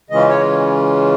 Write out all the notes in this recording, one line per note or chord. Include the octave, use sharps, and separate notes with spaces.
C#3 E3 G#3 C#4 F4 D#5
C#5